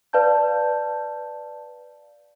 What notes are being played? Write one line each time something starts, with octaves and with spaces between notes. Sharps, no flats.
B4 D5 F5 A5 G6